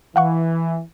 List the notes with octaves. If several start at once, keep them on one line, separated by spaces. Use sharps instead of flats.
E3 F5 F#5 C#6